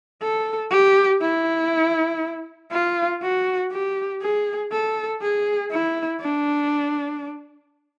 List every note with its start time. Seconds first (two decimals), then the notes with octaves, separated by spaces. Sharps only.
0.22 A4
0.71 G4
1.21 E4
2.72 F4
3.22 F#4
3.72 G4
4.22 G#4
4.72 A4
5.22 G#4
5.71 E4
6.21 D4